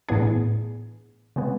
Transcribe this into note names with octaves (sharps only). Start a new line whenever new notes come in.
A2 E3 B3 D4 G#4
C#3 G#3 B3